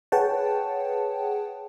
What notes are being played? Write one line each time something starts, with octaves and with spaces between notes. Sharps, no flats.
G#4 B4 C#5 F#5 G5 A5